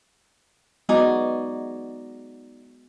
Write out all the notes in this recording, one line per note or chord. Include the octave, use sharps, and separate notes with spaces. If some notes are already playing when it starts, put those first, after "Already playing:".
G#3 B3 D#4 F#4 D5 G#5